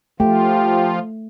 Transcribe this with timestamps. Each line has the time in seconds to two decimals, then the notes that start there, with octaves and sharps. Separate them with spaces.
0.20 F3 A3 F4 G4